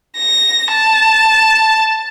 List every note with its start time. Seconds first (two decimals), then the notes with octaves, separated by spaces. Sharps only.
0.17 A#6
0.72 A5